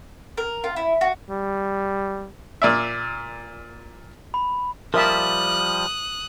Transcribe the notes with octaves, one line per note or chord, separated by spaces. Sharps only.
A#4
F4
E4
F#4
G3
A#2 D5 E5
B5
F3 G3 A#4 E5 A5 D#6 F#6